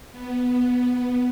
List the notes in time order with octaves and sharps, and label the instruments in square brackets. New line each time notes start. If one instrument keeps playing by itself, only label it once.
[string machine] B3